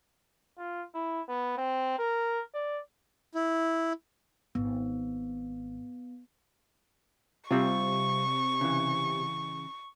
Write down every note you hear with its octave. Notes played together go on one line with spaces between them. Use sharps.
F4
E4
B3
C4
A#4
D5
E4
G#1 B3
C3 G3 C4 F4 C#6
C#3 E3